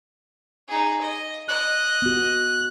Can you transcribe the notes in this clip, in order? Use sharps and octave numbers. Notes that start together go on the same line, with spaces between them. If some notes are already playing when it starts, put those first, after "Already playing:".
D#4 G#4
D#5
D#5 F#6
B3 F#4